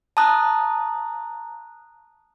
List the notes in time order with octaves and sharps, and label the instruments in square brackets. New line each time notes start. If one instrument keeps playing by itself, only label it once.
[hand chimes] A5 A#5 D#6 F#6